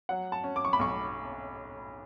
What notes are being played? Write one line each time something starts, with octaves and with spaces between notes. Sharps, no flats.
F#3 F#5
A5
C#4
D6
C#6
B5
B1 C#6